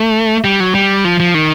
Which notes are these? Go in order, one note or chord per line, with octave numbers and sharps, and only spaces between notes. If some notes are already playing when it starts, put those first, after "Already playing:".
Already playing: A3
G3
F#3
G3
F3
F3
D#3